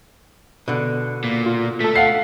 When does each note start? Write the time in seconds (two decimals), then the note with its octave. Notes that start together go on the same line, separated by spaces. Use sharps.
0.68 B2 D3
1.24 A#2
1.46 F4
1.80 A3 A4 B6
1.96 F5 F#5 C7